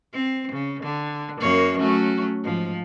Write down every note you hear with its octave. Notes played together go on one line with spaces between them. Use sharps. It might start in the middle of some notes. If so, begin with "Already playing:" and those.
C4
C#3
D3
F#2 A#3 C#5
F#3 A3 C#4
G#2 F3